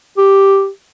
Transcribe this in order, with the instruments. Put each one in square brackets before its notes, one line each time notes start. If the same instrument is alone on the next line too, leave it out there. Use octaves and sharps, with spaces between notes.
[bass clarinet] G4